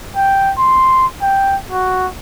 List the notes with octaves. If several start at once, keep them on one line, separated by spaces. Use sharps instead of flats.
G5
C6
G5
F#4